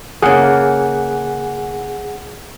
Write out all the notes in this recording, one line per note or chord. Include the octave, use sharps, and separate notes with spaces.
C#3 A#3 G#4 F#5